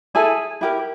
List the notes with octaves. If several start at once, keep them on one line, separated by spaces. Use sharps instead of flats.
E4 G#4 A4 G#5
E4 G4 A#4